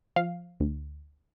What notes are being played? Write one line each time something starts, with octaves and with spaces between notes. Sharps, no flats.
F3 F5
D2